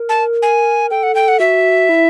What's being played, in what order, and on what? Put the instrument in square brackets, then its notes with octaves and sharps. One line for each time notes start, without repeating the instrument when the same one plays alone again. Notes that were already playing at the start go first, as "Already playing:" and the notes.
Already playing: [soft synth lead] A#4
[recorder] A5
G#5
[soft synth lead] A4 [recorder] G5
[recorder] F#5
G5
F#5
[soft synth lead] F#4 [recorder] E5
[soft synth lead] E4